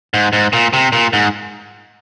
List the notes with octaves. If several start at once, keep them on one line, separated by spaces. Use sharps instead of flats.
G#2
G#2
A#2
C3
A#2
G#2